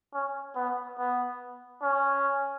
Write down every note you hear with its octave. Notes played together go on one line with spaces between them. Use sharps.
C#4
B3
B3
C#4